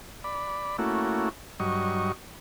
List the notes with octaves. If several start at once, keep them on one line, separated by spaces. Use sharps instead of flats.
D5 B5
A3 A#3 C#4 E4 F#4
G2 F#3 D#5 C#6